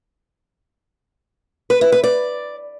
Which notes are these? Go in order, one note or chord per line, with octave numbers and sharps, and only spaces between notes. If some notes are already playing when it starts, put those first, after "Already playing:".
B4
E4
B4
D5